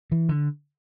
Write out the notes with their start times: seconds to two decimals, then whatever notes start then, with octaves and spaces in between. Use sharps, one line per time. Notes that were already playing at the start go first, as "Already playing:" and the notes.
0.12 E3
0.29 D3